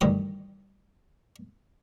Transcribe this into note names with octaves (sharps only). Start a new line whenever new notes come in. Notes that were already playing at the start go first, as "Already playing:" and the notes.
D2 G2 D#3 E3 G4 D#6